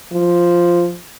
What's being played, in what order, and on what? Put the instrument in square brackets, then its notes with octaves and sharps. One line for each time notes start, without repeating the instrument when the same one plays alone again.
[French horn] F3